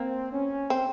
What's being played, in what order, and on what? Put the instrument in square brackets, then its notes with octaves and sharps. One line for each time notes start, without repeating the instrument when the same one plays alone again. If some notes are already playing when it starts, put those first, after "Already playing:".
Already playing: [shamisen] A#3 [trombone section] C4
[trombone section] C#4
[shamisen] C4